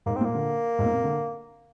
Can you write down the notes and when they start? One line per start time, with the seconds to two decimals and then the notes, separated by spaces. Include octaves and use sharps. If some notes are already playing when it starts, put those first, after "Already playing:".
0.06 G#2 A#3
0.16 C4
0.21 A#2 A#3
0.34 D3
0.79 G#2
0.85 A#2
0.92 C3
1.03 D3